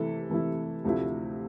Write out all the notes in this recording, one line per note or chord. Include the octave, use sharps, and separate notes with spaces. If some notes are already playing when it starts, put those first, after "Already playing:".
Already playing: C3 E3 A3 E4 A4
C3 E3 A3 E4
D2 C3 F3 A3 E4